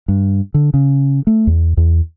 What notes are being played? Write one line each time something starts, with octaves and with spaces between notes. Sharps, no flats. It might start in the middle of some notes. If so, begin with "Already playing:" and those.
G2
D3
C#3
A3
E2
E2